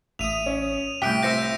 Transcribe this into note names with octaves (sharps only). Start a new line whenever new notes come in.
A1 E5 D#6 D#7 F7
C#4
C2 A2 G5 B6 D7
F4 C5 E5 G6 A#6 C#7